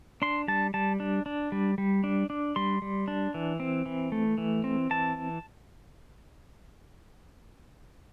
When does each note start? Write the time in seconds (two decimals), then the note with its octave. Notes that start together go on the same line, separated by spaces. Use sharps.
0.22 D4 C6
0.48 G3 A5
0.74 G3 A5
1.00 D4
1.26 D4
1.52 G3
1.78 G3
2.04 D4
2.30 D4
2.56 G3 C6
2.82 G3
3.08 D4
3.34 E3
3.60 C4
3.86 E3
4.12 A3
4.38 E3
4.64 C4
4.90 E3 A5